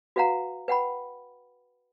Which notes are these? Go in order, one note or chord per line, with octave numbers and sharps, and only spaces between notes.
F#4 B4 F5 F#5 A#5
B4 F#5 G5 B5